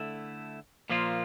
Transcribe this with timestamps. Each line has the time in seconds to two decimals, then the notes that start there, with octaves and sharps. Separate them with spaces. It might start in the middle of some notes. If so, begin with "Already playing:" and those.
Already playing: D3 A3 E4
0.90 A#2 F3 A#3 F4